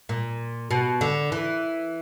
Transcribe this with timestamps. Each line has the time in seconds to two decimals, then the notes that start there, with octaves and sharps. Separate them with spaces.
0.09 A#2
0.71 B2
1.01 D3
1.32 E3